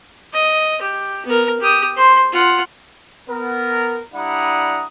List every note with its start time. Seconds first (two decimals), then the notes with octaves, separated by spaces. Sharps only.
0.33 D#5
0.81 G4
1.26 B3 A#4
1.60 G4 D#6
1.96 C5 C6
2.32 F4 F#5
3.29 B3 A#4
4.14 G3 D4 E4 F#5 A#5 D#6